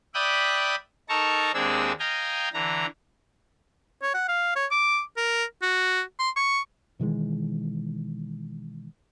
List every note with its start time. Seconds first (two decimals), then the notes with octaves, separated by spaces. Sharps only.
0.14 D5 E5 G5 B5 D#6 F#6
1.09 D#4 A4 A#4 A5 A#5 C#6
1.54 D#2 G#3 C4 D4 G#4 E6
1.99 D#5 F5 G5 G#5 A#5
2.53 D3 E3 A#5
4.02 C#5
4.14 F#5
4.28 F5
4.56 C#5
4.71 D6
5.17 A#4
5.62 F#4
6.19 C6
6.36 C#6
7.00 B2 D#3 E3 G#3